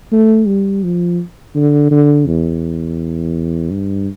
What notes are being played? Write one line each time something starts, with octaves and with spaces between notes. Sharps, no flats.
A3
G3
F3
D3
D3
E2
G2